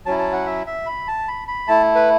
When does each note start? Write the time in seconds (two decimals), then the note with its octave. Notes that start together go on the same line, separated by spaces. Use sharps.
0.06 F#3 C#4 E4 A5
0.19 A5
0.33 F#5
0.46 E5
0.67 E5
0.86 B5
1.08 A5
1.28 B5
1.48 B5
1.68 A3 E4 A5
1.95 B4